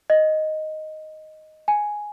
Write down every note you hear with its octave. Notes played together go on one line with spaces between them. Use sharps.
D#5
G#5